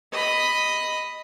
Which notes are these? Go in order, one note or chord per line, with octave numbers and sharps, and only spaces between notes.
D#5 B5